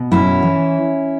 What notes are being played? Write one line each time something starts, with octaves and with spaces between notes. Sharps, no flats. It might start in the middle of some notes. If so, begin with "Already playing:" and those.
Already playing: B2
F#2 C#4 E4
E3